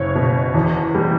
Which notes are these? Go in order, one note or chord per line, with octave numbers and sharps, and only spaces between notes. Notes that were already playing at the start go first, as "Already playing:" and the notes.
Already playing: F#1 C#5
B2
E2
G3